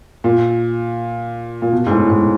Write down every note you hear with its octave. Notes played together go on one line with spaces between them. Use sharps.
A#2
A#2
B2
G#2
A2
G#2